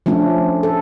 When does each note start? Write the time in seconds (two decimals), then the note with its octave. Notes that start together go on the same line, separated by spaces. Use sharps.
0.06 F3 A3 C#4 D4
0.63 A4